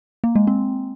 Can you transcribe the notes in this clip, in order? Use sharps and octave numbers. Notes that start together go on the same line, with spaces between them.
A#3
G#3
C4